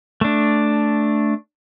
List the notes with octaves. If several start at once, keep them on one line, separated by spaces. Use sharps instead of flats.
A3 D4